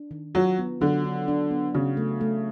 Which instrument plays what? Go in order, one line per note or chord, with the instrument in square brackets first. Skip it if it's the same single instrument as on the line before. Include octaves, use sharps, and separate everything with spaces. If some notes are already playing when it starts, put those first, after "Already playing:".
Already playing: [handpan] D4
D#3
[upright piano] F#3 [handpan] F4
[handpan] B3
[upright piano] D3 [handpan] F#3
[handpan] D4
D4
B3
[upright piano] C#3 [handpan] F#4
[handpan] A3
A3